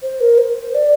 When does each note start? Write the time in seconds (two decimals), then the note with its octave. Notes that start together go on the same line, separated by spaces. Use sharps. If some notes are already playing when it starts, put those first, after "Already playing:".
0.03 C5
0.21 A#4
0.38 C5
0.75 D5